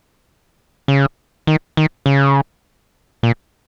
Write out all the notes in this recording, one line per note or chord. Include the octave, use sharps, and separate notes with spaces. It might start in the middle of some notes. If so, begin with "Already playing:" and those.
C#3
D#3
D#3
C#3
A#2